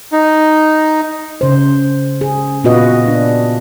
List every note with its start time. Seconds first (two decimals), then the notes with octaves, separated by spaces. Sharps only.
0.12 D#4
1.41 C#3 C5
2.21 G#4
2.64 A#2 B3 F4 F#4 B4 D#5
3.08 D4